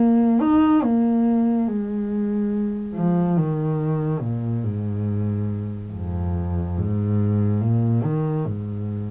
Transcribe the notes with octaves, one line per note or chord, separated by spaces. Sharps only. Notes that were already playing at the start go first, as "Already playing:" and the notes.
Already playing: A#3
D#4
A#3
G#3
F3
D#3
A#2
G#2
F2
G#2
A#2
D#3
G#2